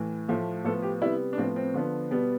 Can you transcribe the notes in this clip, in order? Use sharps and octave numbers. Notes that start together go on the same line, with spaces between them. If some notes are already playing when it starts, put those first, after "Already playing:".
Already playing: A2 E3
A2 F3 A3
A2 F3 B3 A4
G4
C3 G3 B3 E4
D4
A2 F3 B3 C4
C4
D3 F3 B3
B2 G3 B3